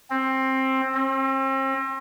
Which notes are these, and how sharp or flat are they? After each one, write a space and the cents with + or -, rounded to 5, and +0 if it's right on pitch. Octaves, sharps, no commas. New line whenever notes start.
C4 +15
C4 +40